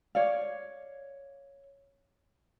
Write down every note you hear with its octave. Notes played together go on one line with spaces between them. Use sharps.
C#5 D5 F5